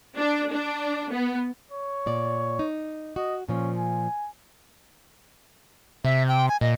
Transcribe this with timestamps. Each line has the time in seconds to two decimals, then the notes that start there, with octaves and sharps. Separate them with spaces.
0.17 D4
0.52 D4
1.11 B3
1.71 C#5
2.06 A#2 D5
2.59 D#4
3.16 F#4 D#5
3.49 A#2 F3 C#4
3.77 G#5
6.05 C3 E5
6.28 G5
6.49 G#5
6.61 A#2 D#5